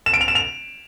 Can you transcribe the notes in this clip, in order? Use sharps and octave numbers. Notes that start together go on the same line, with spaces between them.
E7
D7
F7
E7
F7